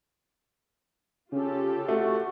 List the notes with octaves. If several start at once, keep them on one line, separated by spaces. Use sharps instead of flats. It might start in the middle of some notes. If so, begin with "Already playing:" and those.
C#3 F4 G4 A4
A3 F#4